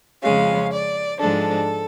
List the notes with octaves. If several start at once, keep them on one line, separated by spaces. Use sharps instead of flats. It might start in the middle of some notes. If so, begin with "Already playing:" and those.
F2 C#3 F3 G#3 C#4 F5
D5
G#2 F3 G#3 D4 A4